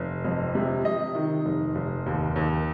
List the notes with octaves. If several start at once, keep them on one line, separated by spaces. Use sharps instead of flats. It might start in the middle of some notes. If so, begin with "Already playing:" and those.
Already playing: F1
F2
C3
C3 D#5
D#3
F1
F1
D#2
D#2